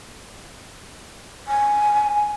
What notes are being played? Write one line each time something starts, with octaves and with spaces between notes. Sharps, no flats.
G#5